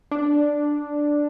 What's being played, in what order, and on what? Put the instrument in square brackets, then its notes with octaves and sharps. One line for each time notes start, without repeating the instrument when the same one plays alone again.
[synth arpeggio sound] D4